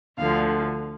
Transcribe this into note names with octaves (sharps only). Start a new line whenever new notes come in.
D2 D3 F3 F5